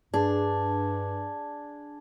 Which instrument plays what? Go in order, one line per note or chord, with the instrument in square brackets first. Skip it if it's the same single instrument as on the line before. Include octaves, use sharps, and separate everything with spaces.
[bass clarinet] G2 [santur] D4 [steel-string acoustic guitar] G#4